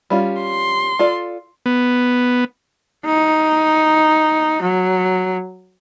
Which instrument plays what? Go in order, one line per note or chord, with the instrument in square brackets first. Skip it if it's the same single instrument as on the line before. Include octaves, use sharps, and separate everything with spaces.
[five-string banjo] G3 C#4 F4
[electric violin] C6
[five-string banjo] F4 A4 D5
[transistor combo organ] B3
[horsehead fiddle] D#4
F#3